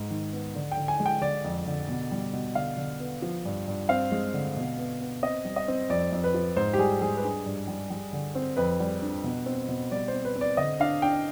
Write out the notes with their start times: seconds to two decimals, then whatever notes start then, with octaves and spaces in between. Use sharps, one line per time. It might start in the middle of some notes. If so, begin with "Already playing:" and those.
Already playing: G#2
0.10 D#3
0.33 B3
0.55 D3
0.71 G5
0.77 D3
0.88 G#5
1.00 G#3
1.06 G5
1.21 D3 D5
1.44 F2
1.66 D3
1.88 B2
2.12 G3
2.33 B2
2.55 D3 F5
2.77 D3
3.00 B3
3.22 F3
3.45 G2
3.67 G2
3.89 C4 F5
4.12 G#3
4.33 D3
4.57 B2
4.78 B3
5.01 B3
5.23 C4 D#5
5.45 G3
5.56 D#5
5.68 C4
5.90 F2 D5
6.12 F2
6.24 B4
6.34 F3
6.56 G#2 C5
6.74 G4
6.78 G3 G#4
7.01 G3 G#4
7.17 B4
7.23 D4 G#4
7.46 G2
7.68 G3
7.90 G3
8.13 D3
8.35 C4
8.57 F2 B4
8.80 G3
9.02 D4
9.24 B2
9.46 C4
9.69 B2
9.91 G3 D5
10.08 C5
10.13 C4
10.25 B4
10.35 C4
10.41 D5
10.57 D3 D#5
10.80 D4 F5
11.02 D4 G5